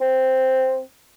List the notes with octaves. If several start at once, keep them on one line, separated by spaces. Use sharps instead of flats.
C4